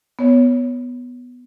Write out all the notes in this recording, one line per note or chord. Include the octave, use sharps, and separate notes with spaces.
B3 C#5